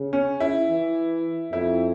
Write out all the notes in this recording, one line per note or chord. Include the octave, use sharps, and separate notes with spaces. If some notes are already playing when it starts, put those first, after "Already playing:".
Already playing: C#3
C#4
E4
E3
F2 E4